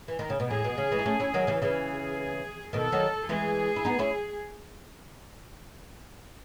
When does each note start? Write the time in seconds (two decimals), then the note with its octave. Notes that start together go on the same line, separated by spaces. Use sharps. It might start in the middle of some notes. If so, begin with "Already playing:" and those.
0.08 E3
0.19 D#3
0.30 C#3
0.40 B2
0.50 A2 G#4
0.64 B2
0.78 C#3
0.92 E3 G#3
0.99 D#4
1.06 A3 C#4
1.20 C#4 E4
1.34 D#3 F#3
1.47 C#3 E3
1.62 C#3 E3 G#4
2.73 B2 D#3 A4
2.92 D#3 F#3
3.29 E3 G#3 G#4
3.76 E4
3.85 B3 D#4
3.99 C#4 E4